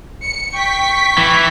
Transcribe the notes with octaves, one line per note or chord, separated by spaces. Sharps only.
C#7
G5 C#6 B6
E3